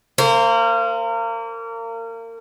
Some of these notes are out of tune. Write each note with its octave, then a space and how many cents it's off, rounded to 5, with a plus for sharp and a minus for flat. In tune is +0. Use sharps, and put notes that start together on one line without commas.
A#3 -30 C5 +0